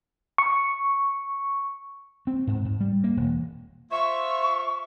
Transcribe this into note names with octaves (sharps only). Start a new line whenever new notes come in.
C#6
C4
G#2
G#2
G3
A#3
E1
F4 C5 E5 C#6